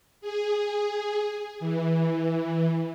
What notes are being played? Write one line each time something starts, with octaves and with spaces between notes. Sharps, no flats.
G#4
E3